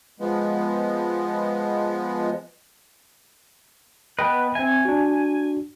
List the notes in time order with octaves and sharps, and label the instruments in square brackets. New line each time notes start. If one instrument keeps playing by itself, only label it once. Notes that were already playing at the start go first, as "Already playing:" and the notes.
[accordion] F3 G#3 B3
[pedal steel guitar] B3 B4 [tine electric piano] D#5 G5
[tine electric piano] C4 E5 [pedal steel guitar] G#5
[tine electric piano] D4 F#4